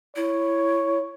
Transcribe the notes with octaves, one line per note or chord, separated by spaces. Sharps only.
E4 C#5